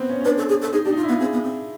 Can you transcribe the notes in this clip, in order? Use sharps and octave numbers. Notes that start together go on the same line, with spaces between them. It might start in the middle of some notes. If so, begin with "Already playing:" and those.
Already playing: B3 C4
C#4
C#4
D4 B4
A4
G#4
A4
D#4 G#4
D4 G4
D#4
D4 F4
E4
B3 F4
C4 G#4
B3
C4